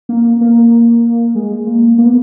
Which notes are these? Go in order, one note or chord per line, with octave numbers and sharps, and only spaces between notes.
A#3
A#3
G#3
G#3
A#3
A#3
B3